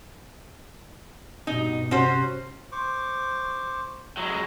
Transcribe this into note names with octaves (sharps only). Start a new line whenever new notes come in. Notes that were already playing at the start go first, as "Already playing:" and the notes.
G2 B2 D#4
C3 C#4 F#4 C5
C5 C#6 D6
F#3 G#3 E4 D#5 A#5